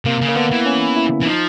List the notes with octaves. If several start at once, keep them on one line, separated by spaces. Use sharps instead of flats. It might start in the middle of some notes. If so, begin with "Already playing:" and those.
C3 A#3
C#3
A#3
D3 B3
E3
C#4
E4
E3
F3 D#4